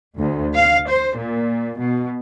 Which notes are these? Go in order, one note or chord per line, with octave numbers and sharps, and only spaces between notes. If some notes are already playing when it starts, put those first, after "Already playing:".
D2
F5
C5
A#2
B2